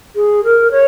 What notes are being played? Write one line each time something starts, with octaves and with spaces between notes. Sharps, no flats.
G#4
A#4
C#5